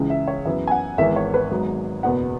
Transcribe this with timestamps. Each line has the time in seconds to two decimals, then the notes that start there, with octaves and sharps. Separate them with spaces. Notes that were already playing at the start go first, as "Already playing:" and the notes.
Already playing: C#2 C#3 E3
0.10 E5
0.28 C#5
0.45 F#2 E3 B3 E5
0.67 G#5
0.71 F#5
0.98 G#1 G#2 E3 G#3 B3 E5
1.16 C#5
1.34 B4
1.51 G#1 G#2 F#3 B3
2.03 F#1 E2 B2 B3 F#5